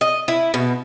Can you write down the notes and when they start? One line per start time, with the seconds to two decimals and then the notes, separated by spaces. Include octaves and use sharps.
0.01 D#5
0.28 E4
0.54 B2